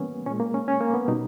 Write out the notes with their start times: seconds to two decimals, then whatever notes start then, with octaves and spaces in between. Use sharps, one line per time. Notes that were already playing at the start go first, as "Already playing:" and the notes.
Already playing: E3 G3 A#3 B3 C#4
0.26 A#2 G#3 C#4
0.40 A#3
0.54 C#4
0.68 C#4
0.81 A#3
0.94 B3
1.08 B2 G3 D#4